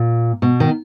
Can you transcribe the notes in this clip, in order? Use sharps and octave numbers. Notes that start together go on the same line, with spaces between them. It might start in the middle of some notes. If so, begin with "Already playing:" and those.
Already playing: A#2
B2
D#3